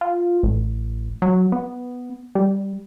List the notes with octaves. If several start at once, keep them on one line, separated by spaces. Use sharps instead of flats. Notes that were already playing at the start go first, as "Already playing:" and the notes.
F4
A1
F#3
B3
G3